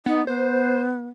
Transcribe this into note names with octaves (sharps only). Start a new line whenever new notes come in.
B3 D#4
B3 C5